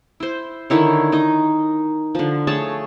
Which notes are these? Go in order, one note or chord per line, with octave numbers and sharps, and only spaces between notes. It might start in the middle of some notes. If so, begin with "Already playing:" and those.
E4 C5
D3 D#3 E4 C#5
D#4 D#5
D3 F3
A3 G#4 C#5 A5